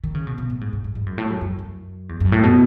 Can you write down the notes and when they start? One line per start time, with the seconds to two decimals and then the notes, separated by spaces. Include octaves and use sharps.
0.04 D#3
0.15 C#3
0.27 B2
0.38 B2
0.50 A2
0.61 G#2
0.73 G#2
0.84 G#2
0.95 G#2
1.06 F#2
1.18 A2
1.30 F#2
1.41 F#2
1.59 F#2
2.09 E2
2.20 F#2
2.32 A2
2.43 B2